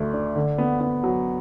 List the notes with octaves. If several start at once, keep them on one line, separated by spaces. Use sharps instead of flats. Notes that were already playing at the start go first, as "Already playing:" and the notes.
Already playing: D2 A3 D4
D4
D3
B3
B3
F#3